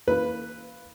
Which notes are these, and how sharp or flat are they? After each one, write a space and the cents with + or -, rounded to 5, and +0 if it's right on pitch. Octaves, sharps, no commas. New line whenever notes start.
E3 -25 A#3 -5 B4 +0